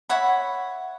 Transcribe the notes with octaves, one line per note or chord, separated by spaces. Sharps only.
C#5 E5 F#5 B5